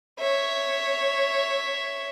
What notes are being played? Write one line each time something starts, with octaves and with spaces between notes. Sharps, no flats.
C#5 E5